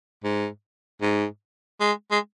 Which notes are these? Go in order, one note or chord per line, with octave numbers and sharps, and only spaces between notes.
G#2
G#2
G#3
G#3